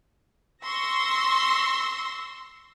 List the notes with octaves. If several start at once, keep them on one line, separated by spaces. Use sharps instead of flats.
C6 C#6 E6 A#6